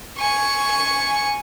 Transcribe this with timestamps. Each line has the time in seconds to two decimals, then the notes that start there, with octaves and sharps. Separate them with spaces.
0.19 G#5 C#6